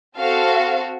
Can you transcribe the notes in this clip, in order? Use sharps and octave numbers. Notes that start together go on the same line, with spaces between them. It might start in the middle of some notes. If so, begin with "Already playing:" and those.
C4 F#4 A4 F5